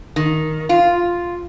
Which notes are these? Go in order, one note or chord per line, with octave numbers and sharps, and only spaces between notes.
D#3
F4